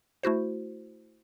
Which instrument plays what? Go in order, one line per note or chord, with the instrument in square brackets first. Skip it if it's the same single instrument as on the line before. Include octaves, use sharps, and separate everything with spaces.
[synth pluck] A3 E4 F#4 C5